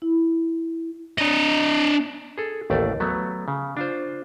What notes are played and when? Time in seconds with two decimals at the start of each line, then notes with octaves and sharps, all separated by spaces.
0.02 E4
1.18 D4 D#5
2.38 G#4 A4
2.70 A1 D#2 A3 D5
3.00 F#3 A3 B3
3.48 C#3
3.77 D4 F4 C5